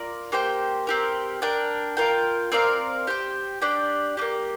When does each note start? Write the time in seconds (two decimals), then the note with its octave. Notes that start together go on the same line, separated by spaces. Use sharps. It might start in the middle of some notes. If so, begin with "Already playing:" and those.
Already playing: F4 A#4 D5
0.32 A#3 G4 C5 G5
0.87 C4 G4 A#4
1.42 D4 A#4 G5
1.97 F4 A#4 G5
2.52 C4 A#4 D5 F5
3.07 G4 C5 G5
3.62 D4 G4 D5 G5
4.17 D4 G4
4.22 A#3